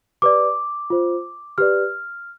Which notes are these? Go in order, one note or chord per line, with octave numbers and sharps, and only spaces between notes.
G4 B4 D5 D6
F4 C5
G4 B4 D5 F6